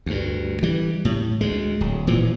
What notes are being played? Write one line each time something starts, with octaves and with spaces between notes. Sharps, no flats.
D2 G2
E3 G3
A2
D2 G#3
D1
A#2 E3 F3